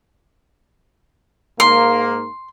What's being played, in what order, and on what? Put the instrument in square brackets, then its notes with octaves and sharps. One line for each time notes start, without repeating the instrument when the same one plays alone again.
[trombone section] G#2 A#3 [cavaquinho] C6